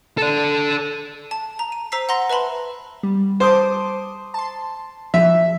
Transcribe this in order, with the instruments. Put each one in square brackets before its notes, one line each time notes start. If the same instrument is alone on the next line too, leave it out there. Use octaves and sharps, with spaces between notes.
[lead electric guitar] A4 D5
[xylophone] A5
A#5
D#7
C5 A#5 E6 B6 C7
F#5 A#5 C6 A#6
B4 E5 A5 B5 C6
[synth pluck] G3
[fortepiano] C5 [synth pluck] A5 D6 D#6
[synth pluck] A5 C6
[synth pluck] F3 [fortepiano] E5